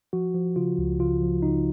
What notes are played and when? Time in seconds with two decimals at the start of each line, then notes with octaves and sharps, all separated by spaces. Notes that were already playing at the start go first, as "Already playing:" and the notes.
0.13 F3 F#4
0.35 F3
0.56 C#3 F4
0.78 C#2
1.00 C#3 F4
1.21 F3
1.42 C#3 D#4